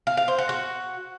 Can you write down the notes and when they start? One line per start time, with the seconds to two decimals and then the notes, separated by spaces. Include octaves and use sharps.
0.07 F5
0.17 F5
0.28 C5
0.38 F#5
0.49 F#4